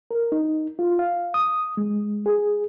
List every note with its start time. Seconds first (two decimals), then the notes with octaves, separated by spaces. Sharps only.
0.11 A#4
0.32 D#4
0.79 F4
0.99 F5
1.34 D#6
1.77 G#3
2.26 G#4